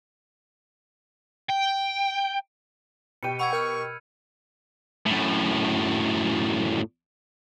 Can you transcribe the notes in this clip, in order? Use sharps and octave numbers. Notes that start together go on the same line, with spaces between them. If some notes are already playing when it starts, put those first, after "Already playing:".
G5
B2 G4 G5 C#7 D#7
F#5 B5 C#6 E6 G#6
A#4 F6 G6
F#2 A2